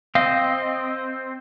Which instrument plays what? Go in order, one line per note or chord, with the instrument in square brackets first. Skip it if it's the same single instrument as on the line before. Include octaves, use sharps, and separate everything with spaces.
[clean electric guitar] C4 [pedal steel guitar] D#5 [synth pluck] F5